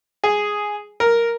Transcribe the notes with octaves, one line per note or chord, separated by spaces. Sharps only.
G#4
A#4